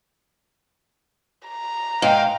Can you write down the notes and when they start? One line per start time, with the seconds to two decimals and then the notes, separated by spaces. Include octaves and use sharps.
1.47 A#5
2.02 G#2 F5 G5